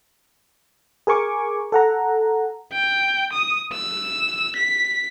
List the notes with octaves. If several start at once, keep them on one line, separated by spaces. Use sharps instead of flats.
G#4 A#4 G#5 C#6 D6
A4 F#5 A#5
G5
D#6
E6
B6